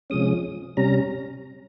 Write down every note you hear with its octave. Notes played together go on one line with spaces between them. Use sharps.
C3 F3 G#3 C#4 D#6
C3 G3 C#4 A#5